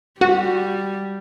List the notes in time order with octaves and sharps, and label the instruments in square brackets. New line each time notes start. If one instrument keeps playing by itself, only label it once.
[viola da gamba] G3 [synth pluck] F#4